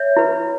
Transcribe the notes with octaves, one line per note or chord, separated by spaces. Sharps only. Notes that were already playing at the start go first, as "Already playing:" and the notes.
Already playing: C#5 E5
E4 B4